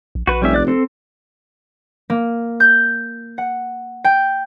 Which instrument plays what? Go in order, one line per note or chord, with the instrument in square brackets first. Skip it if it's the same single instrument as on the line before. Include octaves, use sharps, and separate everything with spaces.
[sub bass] A#1
[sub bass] A#1 [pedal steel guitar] F#4 B4
[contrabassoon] F1 [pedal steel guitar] G3 C#4 E5
[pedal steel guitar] D5 F#6
C4 A4
[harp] A#3
G6
F#5
G5